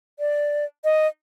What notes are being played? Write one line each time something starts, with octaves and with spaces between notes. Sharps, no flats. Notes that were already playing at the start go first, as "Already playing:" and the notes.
D5
D#5